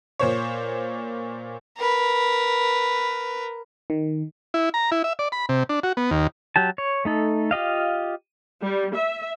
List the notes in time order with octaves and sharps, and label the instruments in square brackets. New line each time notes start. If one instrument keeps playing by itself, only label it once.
[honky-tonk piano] A#2 C5 C#5
[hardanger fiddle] A#4 B4
[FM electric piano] D#3
[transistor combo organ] E4
A#5
E4
E5
D5
B5
C3
D4
F#4
B3
D#2
[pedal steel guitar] F#3 G4 A5
C#5
A3 D#4 A4
F4 G4 D#5 F5
[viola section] G3
E5